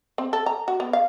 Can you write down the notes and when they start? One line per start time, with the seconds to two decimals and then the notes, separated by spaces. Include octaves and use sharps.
0.18 C4
0.33 A4
0.46 A#5
0.68 F#4
0.80 B3
0.93 F5